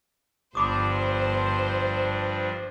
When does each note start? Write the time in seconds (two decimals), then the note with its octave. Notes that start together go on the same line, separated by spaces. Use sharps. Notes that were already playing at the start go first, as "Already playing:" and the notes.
0.55 G1 G2 F3 D4 C5 B5 D6 D#6